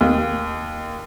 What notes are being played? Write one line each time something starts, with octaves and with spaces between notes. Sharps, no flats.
D#2